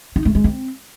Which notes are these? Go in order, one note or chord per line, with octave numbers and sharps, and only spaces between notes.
D#4
A3
G#3
C4